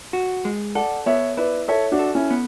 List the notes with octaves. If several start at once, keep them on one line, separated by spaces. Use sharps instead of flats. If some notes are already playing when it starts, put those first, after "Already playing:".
F#4
G#3
A4 D5 F#5
B3 C#5 E5
E4 B4 D5
A4 C#5 E5
D4 F#4
A4
C#4 E4
B3